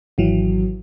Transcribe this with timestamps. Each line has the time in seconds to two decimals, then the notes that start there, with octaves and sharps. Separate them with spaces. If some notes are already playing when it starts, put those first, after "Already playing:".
0.18 G#1 E3 F#3